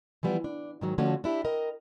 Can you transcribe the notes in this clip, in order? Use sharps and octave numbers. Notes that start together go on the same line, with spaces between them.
E3 F3 G3 B3
D4
G#2 D#3 F#3
D3 F3 A3 C#4 F#4
D4 E4 G4
A#4 D#5 G5